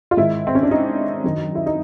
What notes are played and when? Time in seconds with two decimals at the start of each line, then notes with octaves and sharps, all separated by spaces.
0.11 F4
0.17 G#2 D#3 E4
0.47 C4
0.55 C#4
0.63 D4
0.71 D#4
1.24 F#2 D#3
1.55 E4
1.66 D#4